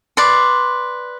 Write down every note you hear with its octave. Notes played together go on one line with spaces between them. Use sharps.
B4 D5 C6